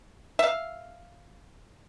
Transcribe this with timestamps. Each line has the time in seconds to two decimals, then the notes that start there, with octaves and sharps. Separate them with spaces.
0.39 E5 F5